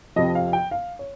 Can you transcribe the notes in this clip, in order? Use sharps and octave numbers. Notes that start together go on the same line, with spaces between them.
F2 C3 F3 D#5
F5
G5
F5
C#5